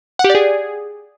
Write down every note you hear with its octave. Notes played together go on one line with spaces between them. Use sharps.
F#5
G4
D5
G#4